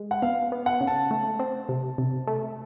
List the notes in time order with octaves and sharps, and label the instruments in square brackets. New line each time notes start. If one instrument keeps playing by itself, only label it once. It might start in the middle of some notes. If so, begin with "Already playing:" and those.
Already playing: [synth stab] G#3
[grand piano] F#5
[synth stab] B3 [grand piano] F5
[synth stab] B3
[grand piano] F#5
[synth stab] C#3
[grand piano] A5
[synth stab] A3
C4
C3
C3
A3